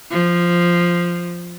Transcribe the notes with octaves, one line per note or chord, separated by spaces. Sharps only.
F3